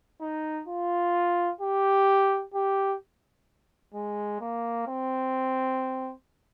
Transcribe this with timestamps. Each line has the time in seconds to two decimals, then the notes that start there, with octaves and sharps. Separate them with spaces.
0.21 D#4
0.68 F4
1.61 G4
2.54 G4
3.94 G#3
4.40 A#3
4.87 C4